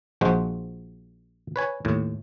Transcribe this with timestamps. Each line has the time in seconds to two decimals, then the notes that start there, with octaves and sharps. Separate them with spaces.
0.21 A#1 F3 G#3 F#4 C5
1.56 B4 C#5 G#5
1.85 D#2 A2